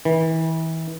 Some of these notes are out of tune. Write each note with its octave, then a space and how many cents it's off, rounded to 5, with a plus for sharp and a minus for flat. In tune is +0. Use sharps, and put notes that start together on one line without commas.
E3 -30